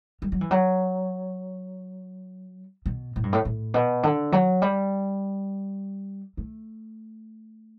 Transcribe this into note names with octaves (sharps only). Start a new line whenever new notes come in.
G3
F#3
E3
F#3
B2
A2
G2
A2
A2
B2
D3
F#3
G3
A3